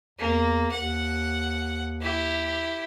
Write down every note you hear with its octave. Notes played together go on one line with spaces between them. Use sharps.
E2 A#3
D#2 F#5
E4 G4